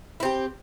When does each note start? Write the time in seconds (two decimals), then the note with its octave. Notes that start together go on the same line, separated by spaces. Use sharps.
0.20 E4
0.23 C4
0.25 G4